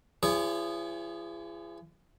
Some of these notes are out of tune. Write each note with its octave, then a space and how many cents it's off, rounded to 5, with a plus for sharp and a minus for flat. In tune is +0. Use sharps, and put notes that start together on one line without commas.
E3 +45 G#4 -20 C#5 +45